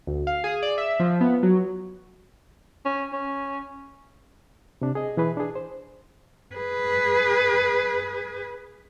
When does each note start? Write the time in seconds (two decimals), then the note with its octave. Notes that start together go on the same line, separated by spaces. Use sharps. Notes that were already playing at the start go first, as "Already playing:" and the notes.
0.07 D2
0.27 F5
0.44 G#4
0.62 D5
0.78 E5
1.00 F3
1.21 B3
1.43 F#3
2.85 C#4
3.12 C#4
4.81 C3 D4
4.95 G#4 D#5
5.17 B2 E3 G#4 B4
5.37 D4 G#4
5.55 C5
6.55 G#4 B4